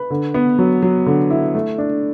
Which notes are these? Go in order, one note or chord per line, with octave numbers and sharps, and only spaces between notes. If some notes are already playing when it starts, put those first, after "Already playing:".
Already playing: B4
D3
B3
F#3
F#3
D3
E4
A3
D4